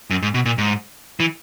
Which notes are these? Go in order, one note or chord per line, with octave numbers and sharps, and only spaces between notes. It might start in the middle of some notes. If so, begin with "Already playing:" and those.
F#2
G#2
B2
A#2
G#2
E3